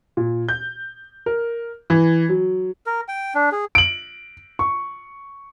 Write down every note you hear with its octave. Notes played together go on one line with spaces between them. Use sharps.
A#2
G6
A#4
E3
F#3
A#4
G5
D4
G#4
D7 F#7
C#6